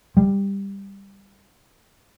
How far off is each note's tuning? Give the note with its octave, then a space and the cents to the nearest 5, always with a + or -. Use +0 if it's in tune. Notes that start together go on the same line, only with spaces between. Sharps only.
G3 +10